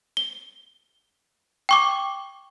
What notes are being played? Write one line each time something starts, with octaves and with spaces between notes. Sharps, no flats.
G7
G5 C#6 D6